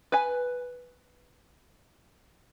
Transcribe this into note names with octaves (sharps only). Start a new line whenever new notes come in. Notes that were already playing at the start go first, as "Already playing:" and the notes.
B4 G#5